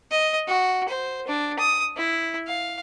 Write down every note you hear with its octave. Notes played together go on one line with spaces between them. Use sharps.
D#5
F#4
C5
D4
D#6
E4
F5